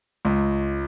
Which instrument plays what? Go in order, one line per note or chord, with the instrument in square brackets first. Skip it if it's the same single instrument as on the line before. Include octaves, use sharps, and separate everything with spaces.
[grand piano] C#2